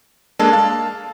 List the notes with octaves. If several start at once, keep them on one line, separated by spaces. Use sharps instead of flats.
G#3 A#3 D4 A4
F5 A5